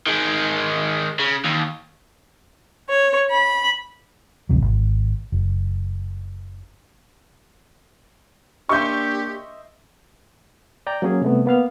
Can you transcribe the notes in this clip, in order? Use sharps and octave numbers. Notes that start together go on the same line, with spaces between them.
D#3 G#3
C#3
D#2
C#5
B5
A1 D2 C3 F#3
G#1
F#1
A#3 D4 G4 D#5 E5 C6 C#6 G6
D5 G5 A#5
F#3 A#3 C#4 G#4
C3 G3 A3 B3
A#3 B3 F5 F6